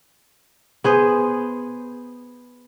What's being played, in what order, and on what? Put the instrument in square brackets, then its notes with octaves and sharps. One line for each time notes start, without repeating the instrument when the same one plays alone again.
[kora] B3 G#4 C5